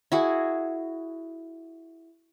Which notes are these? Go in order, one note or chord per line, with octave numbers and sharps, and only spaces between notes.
E4 F#4 G#4